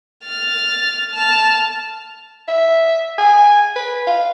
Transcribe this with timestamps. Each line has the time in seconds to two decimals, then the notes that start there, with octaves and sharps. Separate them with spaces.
0.25 F6 A6
1.13 A5 F6
2.48 E5
3.18 G#5
3.76 B4
4.07 F5